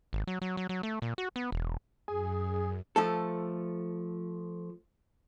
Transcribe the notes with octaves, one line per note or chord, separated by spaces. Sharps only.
G#1
F#3
F#3
F#3
F#3
A3
A#2
F#4
B3
E1
F#2 G#4
F3 A3 A4